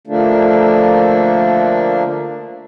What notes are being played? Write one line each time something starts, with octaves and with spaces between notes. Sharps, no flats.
D3 F3 A3 A#3 D4